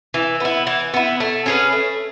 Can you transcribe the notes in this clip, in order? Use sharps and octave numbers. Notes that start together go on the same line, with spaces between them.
E3
B3 E4
E3
B3 E4
A3
C#4 G#4 B4
A3